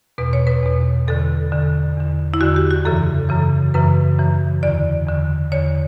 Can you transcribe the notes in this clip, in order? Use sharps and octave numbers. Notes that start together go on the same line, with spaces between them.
E2 B2 B4
C#5
B4
E2 B2
E2 D3 A4
E2 D3
E2 D3
E4
E2 D3 F#4
G4
F#4
F#2 C#3 E3 A4
F#2 C#3 E3
F#2 C#3 E3 B4
F#2 C#3 E3
E2 D3 D5
E2 D3
E2 D3 C#5